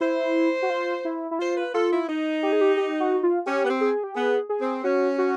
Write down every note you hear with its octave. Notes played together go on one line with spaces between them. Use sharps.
E4 C5
F#4
F4
E4
E4
F4 C5
B4
F4 A4
E4
D#4
G4
G#4
G4
G4
F#4
F4
C#4 G4
B3
C4
G#4
G4
B3 G#4
G#4
C4
C#4 F#4
F#4